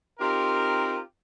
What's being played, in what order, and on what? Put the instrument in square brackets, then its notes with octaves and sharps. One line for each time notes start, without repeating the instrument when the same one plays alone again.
[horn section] C4 D#4 F4 G4 A#4